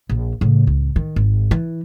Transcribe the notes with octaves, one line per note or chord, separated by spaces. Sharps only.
A#1
A2 C#3
C#2
D#3
G#1
E3